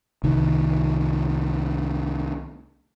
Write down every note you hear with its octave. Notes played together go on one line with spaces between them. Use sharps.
C2 D#3